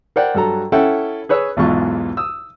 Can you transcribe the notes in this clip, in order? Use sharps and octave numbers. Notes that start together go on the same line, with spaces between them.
A#4 C5 D5 F#5 G5
G2 F#3 A4 A#5
C#4 E4 A4 E5 F#5 G5
G#4 B4 C#5 E6
B1 E2 G#2 E3 F4 C#6
D#6 E6